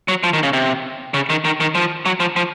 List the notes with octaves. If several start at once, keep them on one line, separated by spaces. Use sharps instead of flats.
F#3
F3
D#3
C#3
C3
C#3
D#3
D#3
D#3
F3
F#3
F3
F3